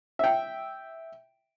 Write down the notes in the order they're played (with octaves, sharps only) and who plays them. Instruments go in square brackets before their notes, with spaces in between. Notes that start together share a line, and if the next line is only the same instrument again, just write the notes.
[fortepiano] E5 G5